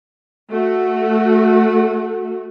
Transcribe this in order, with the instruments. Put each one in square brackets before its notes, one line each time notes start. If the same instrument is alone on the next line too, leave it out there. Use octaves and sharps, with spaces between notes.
[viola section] A3 F#4